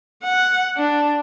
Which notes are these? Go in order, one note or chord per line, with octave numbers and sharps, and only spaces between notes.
F#5
D4